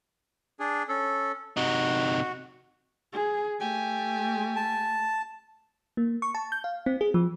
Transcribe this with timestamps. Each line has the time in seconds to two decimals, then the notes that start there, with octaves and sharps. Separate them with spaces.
0.60 D4 G#4
0.89 C#4 A4
1.57 C3 D#4 F#4
3.13 G#4
3.60 A3 G4 G#5
4.56 A5
5.97 A#3
6.22 C#6
6.35 A5
6.52 G6
6.64 F5
6.86 C4
7.01 G#4
7.14 F3